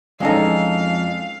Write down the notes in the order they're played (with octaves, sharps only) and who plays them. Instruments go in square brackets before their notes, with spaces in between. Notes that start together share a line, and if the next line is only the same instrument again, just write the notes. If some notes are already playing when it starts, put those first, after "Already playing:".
[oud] F2 D#4 [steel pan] E3 C#4 [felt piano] G#3 A4 [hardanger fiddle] F5